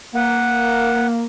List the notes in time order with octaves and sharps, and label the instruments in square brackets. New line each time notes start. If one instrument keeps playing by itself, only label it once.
[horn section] A#3 [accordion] F#5